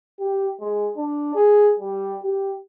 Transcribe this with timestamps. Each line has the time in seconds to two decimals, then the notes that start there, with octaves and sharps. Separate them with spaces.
0.19 G4
0.61 G#3
0.97 D4
1.35 G#4
1.79 G3
2.23 G4